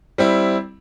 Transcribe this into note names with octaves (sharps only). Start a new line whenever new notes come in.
G3 C4 E4